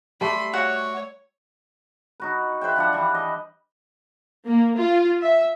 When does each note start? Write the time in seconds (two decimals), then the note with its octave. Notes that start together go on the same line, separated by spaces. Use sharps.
0.21 G3 A3 B5 C6
0.53 F#4 C#5 F#5 C#6
2.20 D#4 F#4 B4
2.61 B4 C5 E5 G5
2.76 F3 D4 F#5
2.93 E3 G3
3.15 D#5
4.45 A#3
4.77 F4
5.21 E5